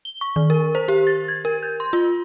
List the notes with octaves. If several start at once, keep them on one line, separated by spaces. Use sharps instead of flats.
G7
C#6
D#3
A#4
C5
G4
A6
G#6
A#4
G6
C6
F4